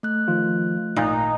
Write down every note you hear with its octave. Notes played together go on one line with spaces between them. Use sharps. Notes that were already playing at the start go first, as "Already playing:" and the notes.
A3 F#6
D#3 F3 F4
G#1 A#2 D#4